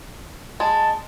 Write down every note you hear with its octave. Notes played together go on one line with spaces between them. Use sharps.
G#3 A5